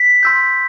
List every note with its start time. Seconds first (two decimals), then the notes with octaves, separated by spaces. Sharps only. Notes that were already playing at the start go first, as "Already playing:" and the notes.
Already playing: B6
0.23 C6 E6 G6